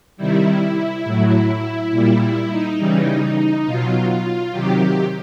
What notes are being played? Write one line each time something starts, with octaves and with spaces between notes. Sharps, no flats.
C3 D#3 G3 E4
A2 F#3
A#2 G3 E4
E4
D#4
C#3 E3 G3
B2 F#3 F4
F4
C3 D#3 F#3 G4